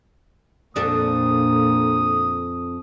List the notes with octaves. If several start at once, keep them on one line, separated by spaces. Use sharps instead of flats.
F2 A#2 D4 A4 D#6